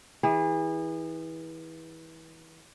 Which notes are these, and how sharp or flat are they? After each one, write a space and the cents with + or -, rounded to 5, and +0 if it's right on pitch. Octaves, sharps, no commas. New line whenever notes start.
E3 -25 G#4 -35